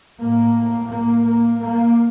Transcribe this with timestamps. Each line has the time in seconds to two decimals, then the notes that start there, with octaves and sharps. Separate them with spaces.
0.20 A2 A#3
0.91 A#3
1.26 A#3
1.61 A#3